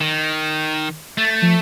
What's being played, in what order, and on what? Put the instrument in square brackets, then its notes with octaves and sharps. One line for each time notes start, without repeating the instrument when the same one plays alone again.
[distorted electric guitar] D#3
[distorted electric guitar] A3 [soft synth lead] A6
[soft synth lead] F3